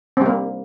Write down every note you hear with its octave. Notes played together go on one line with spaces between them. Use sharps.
G3 A#3 C4